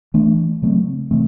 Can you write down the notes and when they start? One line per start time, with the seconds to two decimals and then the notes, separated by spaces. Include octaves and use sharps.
0.14 E3 A3 D4
0.62 C#3 F#3 A3 C4
1.11 C3 E3 A3 C4